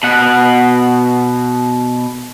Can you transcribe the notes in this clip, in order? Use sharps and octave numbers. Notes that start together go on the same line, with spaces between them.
B2 F#5